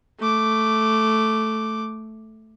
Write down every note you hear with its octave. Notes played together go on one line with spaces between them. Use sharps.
A3 D6